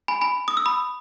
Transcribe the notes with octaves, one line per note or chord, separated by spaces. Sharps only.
G#5 B5
G#5 B5
D#6
E6
B5 D#6